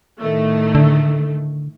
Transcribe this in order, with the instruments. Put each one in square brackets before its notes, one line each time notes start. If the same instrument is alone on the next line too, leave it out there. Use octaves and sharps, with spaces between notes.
[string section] A2 D#3 A3
[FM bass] D3